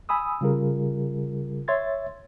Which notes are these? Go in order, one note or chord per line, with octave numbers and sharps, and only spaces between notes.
G#5 B5 D#6 E6
C#3 G3 F4 G#4 A#4
C#5 E5 C6 G#6 A6